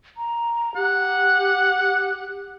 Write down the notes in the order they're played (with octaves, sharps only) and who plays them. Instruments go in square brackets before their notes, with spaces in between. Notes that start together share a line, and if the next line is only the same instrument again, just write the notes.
[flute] A#5
[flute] G4 [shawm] F#5